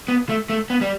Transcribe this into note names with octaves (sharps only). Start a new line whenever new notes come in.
B3
A3
A3
B3
G3